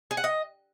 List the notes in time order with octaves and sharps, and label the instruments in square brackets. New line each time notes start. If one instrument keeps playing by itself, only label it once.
[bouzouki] G#4
F#5
D#5